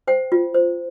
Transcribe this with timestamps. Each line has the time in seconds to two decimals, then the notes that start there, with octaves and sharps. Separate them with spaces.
0.07 C5 G5
0.32 F4
0.54 C5